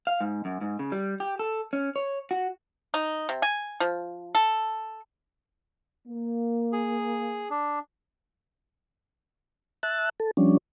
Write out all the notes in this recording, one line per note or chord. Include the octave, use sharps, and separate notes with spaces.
F5
G#2
F#2
G#2
C#3
G3
G4
A4
C#4
C#5
F#4
D#4
C3
G#5
F3
A4
A#3
G#4
D4
E5 A5 F#6
A4
F3 G3 C#4 D4